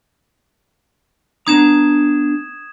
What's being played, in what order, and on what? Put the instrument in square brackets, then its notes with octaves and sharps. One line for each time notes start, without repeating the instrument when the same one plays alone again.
[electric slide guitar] B3 D4 A#5 [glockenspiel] D#6 G#6 E7